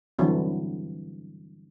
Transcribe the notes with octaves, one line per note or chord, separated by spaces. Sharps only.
D3 E3 F#3 G3 C4